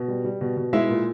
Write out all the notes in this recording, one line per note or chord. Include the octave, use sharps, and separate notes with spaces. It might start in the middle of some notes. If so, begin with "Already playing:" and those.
Already playing: B2
G3
G3
B2
B2
G#3 E4 E5
A#2